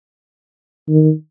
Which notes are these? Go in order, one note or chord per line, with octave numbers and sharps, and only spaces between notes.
D#3